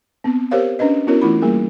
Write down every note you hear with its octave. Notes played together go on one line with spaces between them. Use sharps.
B3 C4
G4 A#4 C5 C#5 F5
C#4 D4 B4 D#5
B3 C#4 E4 F#4 A#4 C#5
E3 A3 E4 F4 B5
G3 A#3 G#4 A#4